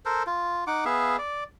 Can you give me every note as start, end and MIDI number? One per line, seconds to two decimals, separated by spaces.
0.05 0.23 69
0.05 0.23 70
0.05 0.23 72
0.27 0.64 65
0.67 0.84 63
0.67 0.84 78
0.67 0.84 86
0.85 1.17 59
0.85 1.17 68
0.85 1.17 76
0.85 1.17 77
1.18 1.44 74